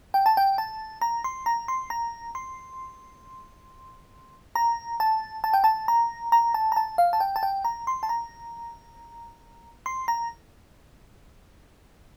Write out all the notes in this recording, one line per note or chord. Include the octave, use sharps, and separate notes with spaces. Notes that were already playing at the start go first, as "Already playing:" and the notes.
G5
A5
G5
A5
A#5
C6
A#5
C6
A#5
C6
A#5
A5
A5
G5
A5
A#5
A#5
A5
A#5
A5
F5
A5
G5
A5
G5
A#5
C6
A5
A#5
C6
A#5